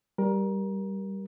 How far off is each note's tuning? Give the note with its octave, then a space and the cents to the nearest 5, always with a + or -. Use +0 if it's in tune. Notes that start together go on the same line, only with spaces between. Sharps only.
G3 +0 A#4 +20